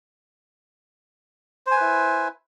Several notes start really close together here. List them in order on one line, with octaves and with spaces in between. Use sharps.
C5 G#5 B4 E4